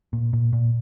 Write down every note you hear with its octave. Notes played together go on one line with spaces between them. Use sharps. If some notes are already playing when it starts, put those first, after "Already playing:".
A#2
A#2
A#2